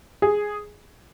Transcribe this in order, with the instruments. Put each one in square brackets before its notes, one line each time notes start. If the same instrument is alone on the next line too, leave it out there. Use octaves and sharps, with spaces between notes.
[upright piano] G#4